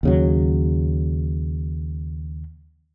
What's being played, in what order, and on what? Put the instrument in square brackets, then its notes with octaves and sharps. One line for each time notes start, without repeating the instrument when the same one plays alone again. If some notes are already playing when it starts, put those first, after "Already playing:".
[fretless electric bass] D#2 C#3 F#3